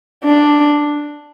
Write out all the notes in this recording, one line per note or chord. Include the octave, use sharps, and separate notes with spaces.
D4